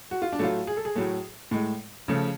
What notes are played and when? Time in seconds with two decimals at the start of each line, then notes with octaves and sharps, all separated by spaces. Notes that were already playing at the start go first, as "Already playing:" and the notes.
0.11 F#4
0.22 F4
0.33 D4
0.39 A2 F#3 A3 F4
0.67 G#4
0.77 A4
0.85 G#4
0.95 A2 F#3 A3
1.51 A2 G#3
2.08 C#3 F3 A3